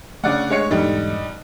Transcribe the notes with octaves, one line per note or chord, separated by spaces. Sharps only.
C#3 A3 D4 D5 F#5
G#3 C#5 C#7
E2 G#2 D3 G3 B3 D#4